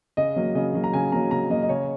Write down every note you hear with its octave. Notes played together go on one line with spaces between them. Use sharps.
C#3 D#5
F#3 A#3
C#3 D#5
F#3 A#3
A#5
C#3 G#5
F#3 A#3 A#5
C#3 A#5
F#3 A#3 D#5
D#5
C#3 C#5